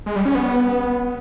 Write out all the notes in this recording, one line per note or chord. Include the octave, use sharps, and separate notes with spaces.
G#3
G3
C#4
B3